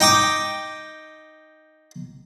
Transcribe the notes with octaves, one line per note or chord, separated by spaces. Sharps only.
D#4 G5 D6 D#6